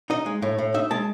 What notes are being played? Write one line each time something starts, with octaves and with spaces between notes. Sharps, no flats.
D#4 D#5
G#3
A2
A2
D#4 E5
G#3 A5